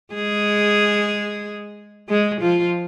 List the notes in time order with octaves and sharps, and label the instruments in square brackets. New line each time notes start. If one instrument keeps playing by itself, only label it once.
[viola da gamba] G#3 G#4
G#3 G#4
F3 F4